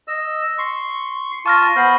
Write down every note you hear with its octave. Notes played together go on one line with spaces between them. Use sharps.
D#5 E6
C6 C#6
F4 A5 C#6 F6 A#6
B3 C5 B5 F6